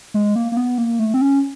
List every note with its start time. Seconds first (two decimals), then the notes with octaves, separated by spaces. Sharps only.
0.14 G#3
0.36 A#3
0.52 A#3
0.57 B3
0.78 A#3
0.99 A3
1.14 C4
1.21 C#4